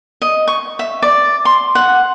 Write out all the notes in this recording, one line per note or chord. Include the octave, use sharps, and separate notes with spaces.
D#5
C#6
E5
D5
C6
F#5